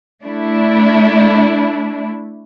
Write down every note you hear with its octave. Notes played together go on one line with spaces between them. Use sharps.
A3 D4 E4